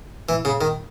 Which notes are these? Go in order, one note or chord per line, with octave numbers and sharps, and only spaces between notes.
E3
C#3
D#3